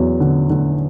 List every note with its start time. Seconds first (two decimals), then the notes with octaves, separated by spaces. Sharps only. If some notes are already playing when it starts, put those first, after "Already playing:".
Already playing: E2 F#3
0.20 D3
0.50 D3